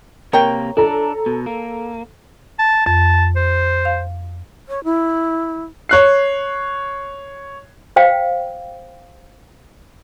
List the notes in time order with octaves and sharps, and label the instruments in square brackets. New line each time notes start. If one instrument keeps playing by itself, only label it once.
[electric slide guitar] C3 A#3 [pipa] A#4 C#5 G5
[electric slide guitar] D4 [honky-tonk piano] A4 A#5
[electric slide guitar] B2
A#3
[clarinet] A5
[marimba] F2 [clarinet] A5
[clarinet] C5
[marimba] F5
[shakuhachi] C#5
E4
[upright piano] C#5 F#6 C7
[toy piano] C5 F5 G5